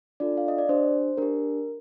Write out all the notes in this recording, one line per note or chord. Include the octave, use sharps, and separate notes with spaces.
D4 F4 A4 D5
F5
D#5
D5
D4 G4 C5
D4 G4 A#4